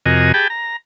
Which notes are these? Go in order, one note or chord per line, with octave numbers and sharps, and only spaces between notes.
F2 C3 F#4 A#4 D#5 G#5
G4 G#4 G5 A5 B5
A#5